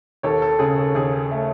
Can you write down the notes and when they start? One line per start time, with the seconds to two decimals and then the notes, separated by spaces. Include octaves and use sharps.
0.23 D#2 A4 C#5
0.42 A4
0.59 C#3 G#4
0.78 A4
0.95 D#2 G#4
1.31 A3